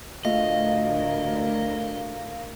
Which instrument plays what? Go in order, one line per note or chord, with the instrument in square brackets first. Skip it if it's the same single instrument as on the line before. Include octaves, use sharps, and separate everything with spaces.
[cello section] D2 A2 A#4 [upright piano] A3 F4 [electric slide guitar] D#5 [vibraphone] F5